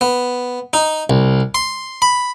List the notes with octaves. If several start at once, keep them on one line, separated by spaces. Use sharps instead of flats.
B3
D#4
C2
C6
B5